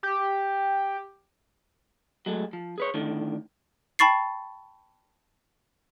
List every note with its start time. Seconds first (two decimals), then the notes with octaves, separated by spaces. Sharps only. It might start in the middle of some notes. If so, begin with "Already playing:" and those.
0.03 G4
2.26 F#3 G#3 A3
2.53 F3
2.78 G#4 B4 C#5
2.94 A2 D3 D#3
3.99 G5 A5 B5 C#6 A6 C7